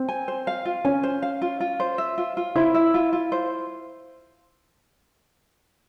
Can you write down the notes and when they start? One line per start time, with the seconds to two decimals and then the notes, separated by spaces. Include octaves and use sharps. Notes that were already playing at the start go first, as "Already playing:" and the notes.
Already playing: C4
0.09 G#5
0.28 C5
0.47 F5
0.65 F4
0.85 C#4 G#5
1.03 C5
1.22 F5
1.42 F4
1.60 F4
1.80 C5
1.98 E5
2.18 F4
2.37 F4
2.56 E4 C5
2.74 E5
2.94 F4
3.13 F4
3.32 C5